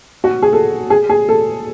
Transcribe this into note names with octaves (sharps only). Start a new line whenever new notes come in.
F#4
G#4
A4
G#4
G#4
A4